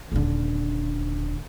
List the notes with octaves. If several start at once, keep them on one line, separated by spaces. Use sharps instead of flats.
D#1 D3